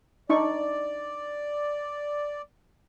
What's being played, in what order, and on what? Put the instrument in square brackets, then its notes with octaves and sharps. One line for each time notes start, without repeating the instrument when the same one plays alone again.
[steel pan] D4 D#4 C#6 [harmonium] D5